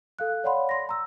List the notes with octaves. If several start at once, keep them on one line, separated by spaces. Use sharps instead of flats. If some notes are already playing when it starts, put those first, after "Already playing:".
A4 F5 F#6
C#5 D5 F5 F#5 B5 C6
C6 A#6
A#5 E6